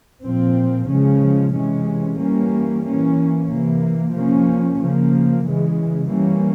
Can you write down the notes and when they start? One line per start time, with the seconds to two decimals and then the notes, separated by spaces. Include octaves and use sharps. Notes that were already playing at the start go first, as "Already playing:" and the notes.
0.23 A#2 F3 C4
0.89 C#3 F3 G#3 C#4
1.54 C3 E3 G#3 C#4
2.19 E3 G3 A#3 C#4
2.84 E3 A#3 C#4
3.49 C3 E3 A#3
4.13 F3 A#3 C#4
4.79 C#3 F3 A#3
5.44 C#3 E3 G#3
6.09 E3 G3 A#3 C#4